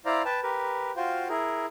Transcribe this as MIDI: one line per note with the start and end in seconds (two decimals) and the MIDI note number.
0.05 0.22 64
0.05 0.22 72
0.05 0.22 74
0.05 0.22 77
0.05 0.22 82
0.25 0.40 71
0.25 0.40 79
0.25 0.40 81
0.43 0.91 67
0.43 0.91 70
0.43 0.91 71
0.96 1.28 65
0.96 1.28 66
0.96 1.28 72
0.96 1.28 77
0.96 1.28 79
1.29 1.66 64
1.29 1.66 68
1.29 1.66 70